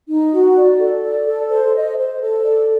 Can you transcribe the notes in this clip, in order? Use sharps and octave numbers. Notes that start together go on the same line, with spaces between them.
D#4
F#4
D5
A4
D5
A4
C5
D#5
C5
A4
D5